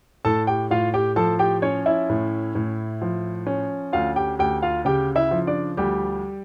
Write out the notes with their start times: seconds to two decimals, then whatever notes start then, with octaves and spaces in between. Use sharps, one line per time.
0.25 A2 A4 A5
0.47 G4 G5
0.70 A2 F4 F5
0.94 G4 G5
1.16 F3 A4 A5
1.39 G4 G5
1.62 C#4 C#5
1.86 E4 E5
2.09 A2
2.55 A2
3.02 F3
3.47 C#4
3.93 D2 F4 F5
4.16 G4 G5
4.39 D2 G4 G5
4.63 F4 F5
4.85 C#3 G4 G5
5.16 E4 E5
5.31 F3
5.47 D4 D5
5.77 D2 G3 G4